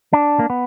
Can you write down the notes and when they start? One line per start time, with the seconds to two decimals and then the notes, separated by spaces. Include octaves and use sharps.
0.13 D4
0.39 A#3
0.50 B3